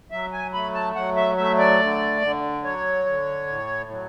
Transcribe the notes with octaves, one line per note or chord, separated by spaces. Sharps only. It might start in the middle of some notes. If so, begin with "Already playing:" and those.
F#3 E5
G#5
A3 B5
A5
F#3 F#5
E5
A3 E5
D5
D3
D3
F#3 C#5
D3
A2
F#3